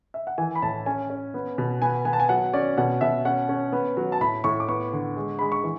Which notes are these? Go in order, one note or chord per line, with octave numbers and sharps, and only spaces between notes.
E5
F#5
E3 G#5
B5
A2 A5
C#4 G#5
C#4
B3
B2
B3 G#5
B3 G#5
A5
G#5
F#3 F#5
C#4 D5
B2 F#5
B2 E5
C#4 F#5
C#4
B3
F#3
A5
A2 B5
A2 C#6
D6
B3 C#6
D3
G#3
G#3 B5
C#6
E3